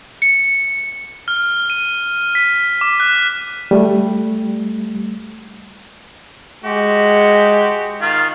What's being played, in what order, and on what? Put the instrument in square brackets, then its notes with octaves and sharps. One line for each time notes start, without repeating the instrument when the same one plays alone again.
[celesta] C#7
[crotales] F6
D#7
B6
D6
F#6
[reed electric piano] G3 A3
[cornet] G#3 [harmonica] F#4 G4
[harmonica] D#3 F4